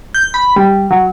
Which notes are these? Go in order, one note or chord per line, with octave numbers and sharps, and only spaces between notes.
G6
B5
G3
F#3